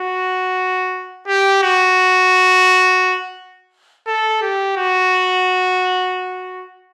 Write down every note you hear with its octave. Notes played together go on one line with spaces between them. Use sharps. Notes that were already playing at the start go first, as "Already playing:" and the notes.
Already playing: F#4
G4
F#4
A4
G4
F#4